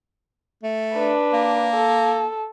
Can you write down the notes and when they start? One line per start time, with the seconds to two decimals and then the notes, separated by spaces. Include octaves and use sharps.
0.63 A3
0.94 D4 B4
1.33 A#3
1.75 A4